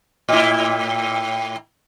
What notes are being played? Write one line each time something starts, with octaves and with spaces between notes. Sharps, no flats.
A2 E4